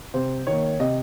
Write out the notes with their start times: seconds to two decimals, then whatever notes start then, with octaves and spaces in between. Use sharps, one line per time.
0.14 C3 C5
0.47 D#3 A#3 C#5
0.80 C3 D#5